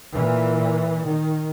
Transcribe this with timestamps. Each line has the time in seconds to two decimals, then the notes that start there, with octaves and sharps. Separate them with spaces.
0.13 A#2 E3
1.05 D#3